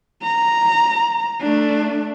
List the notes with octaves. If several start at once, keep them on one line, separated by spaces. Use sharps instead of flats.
A#5
A3 D4